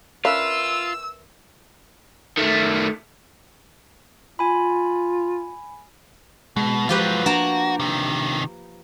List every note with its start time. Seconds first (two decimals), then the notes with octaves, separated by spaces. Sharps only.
0.25 C#4 D4 F4 A#4 B4 E5 F5 E6
2.37 D#3 A3
4.39 F4 G#5 B5
6.56 B2 G#3
6.89 F3 F#3 G#3 F4 G4 B4
7.26 A#3 D4 F#4 A5 A#5
7.80 C3 D#3